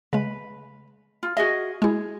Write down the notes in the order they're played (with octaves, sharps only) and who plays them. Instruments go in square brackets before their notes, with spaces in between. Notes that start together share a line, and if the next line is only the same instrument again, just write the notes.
[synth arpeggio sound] C#3 G#3 [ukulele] B4
[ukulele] F4
[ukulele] F#4 G#4 D#5 [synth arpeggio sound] E5
[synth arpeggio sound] G#3 E4 [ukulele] G#4